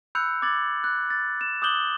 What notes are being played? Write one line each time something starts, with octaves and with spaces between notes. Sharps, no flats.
B5 E6 F#6 G6 C#7 F7
D6 G#6 A6 F#7
F#6
A6
E7
D6 D#6 F#6 G6 F#7 G7